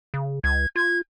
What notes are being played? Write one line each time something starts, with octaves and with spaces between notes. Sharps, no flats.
C#3
C#2 G#6
F4 G#6